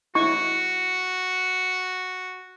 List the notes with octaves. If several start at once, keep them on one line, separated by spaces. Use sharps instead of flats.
E4 F#4 D#5 C#6